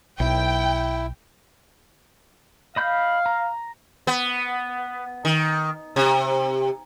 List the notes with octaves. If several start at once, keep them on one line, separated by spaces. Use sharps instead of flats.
B1 E4 G5
D#5 F5 B5 G6
A#5
B3
D#3
C3